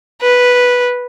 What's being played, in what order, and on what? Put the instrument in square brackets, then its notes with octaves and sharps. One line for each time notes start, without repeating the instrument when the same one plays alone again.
[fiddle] B4